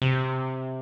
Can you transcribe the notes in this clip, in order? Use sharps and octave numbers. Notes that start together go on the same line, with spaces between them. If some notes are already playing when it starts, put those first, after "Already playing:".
C3